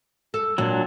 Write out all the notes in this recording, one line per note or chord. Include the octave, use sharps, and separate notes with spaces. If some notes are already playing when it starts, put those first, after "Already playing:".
A4
A#2 F#3 D4